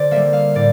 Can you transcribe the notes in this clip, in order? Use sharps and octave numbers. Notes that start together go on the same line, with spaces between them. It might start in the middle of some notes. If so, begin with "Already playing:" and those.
Already playing: D3 C5 D5
G3 A#3 E5
F5
A2 D5